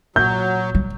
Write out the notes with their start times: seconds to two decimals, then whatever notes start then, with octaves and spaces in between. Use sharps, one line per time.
0.16 A#2 F#3 G6
0.75 G3